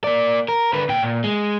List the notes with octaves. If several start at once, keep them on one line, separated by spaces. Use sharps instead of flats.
A#3 D5
A#4
D3 B4
A#2 G5
A#2
G#3